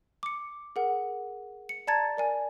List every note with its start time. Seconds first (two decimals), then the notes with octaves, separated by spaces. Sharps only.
0.23 D6 C#7
0.76 G#4 A#4 F#5
1.69 C#7
1.87 D5 A5 A#5 G#6 A6
2.17 A#4 D5 G#5